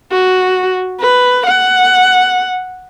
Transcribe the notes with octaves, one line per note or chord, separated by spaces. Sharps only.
F#4
B4
F#5